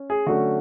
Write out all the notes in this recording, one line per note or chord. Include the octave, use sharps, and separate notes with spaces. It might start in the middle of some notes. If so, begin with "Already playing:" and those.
Already playing: C#4
G#4
D3 F#3 A3 C#4 F#4